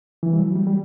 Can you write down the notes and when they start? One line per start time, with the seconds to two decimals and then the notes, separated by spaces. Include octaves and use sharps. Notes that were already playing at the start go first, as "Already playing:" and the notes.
0.23 E3
0.33 G3
0.40 F#3
0.56 G3
0.67 G3